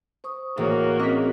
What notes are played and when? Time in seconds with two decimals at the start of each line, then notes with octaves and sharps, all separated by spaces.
0.24 C5 C#6 D#6
0.58 A1 A#3 F#4 G#4 C#5
0.99 C4 C#4 G#4 D#5 B6